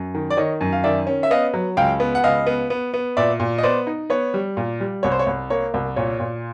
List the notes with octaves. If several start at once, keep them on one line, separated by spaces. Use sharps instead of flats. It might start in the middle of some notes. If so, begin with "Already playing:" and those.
Already playing: F#2
D#3
D5
D#3 C#5 D#5
F#2
F5
D#3 D5 E5
C#4
E5
B3 D#5 F5
F#3
C#2 F5 G5
B3
F#5
C#2 D#5 F5
B3
B3
B3
A#2 D5 E5
A#2
D#5
B3 C5 D5
D#4
B3 C#5
G3
A#2
G3
C2 C#5
C5
C#5
C2
A#3 C#5
C2
A#2 C#5
A#2